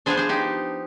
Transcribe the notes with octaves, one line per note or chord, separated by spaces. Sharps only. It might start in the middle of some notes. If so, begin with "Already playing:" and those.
F3 B3 D4 G#4 C5
G#4 C5
D#4 G4